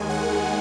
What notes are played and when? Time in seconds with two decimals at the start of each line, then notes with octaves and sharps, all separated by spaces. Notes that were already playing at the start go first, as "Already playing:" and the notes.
Already playing: D#2 D#3 G#3 G#5
0.10 F#5